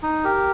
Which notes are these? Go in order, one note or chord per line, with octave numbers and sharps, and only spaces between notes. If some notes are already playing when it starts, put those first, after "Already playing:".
D#4
G4 A#4